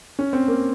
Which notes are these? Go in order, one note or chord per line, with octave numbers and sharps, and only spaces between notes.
C#4
C4
A#3